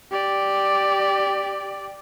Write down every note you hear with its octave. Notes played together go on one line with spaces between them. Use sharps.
G4 D5